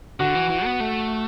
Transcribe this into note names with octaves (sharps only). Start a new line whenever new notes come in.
D3 F#4
E3
E3
B3
A3